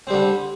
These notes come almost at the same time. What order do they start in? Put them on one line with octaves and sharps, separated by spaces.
C4 G3 D3